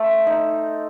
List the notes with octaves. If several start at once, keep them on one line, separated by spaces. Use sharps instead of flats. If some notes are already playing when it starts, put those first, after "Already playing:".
Already playing: A3 A4 C5
D#4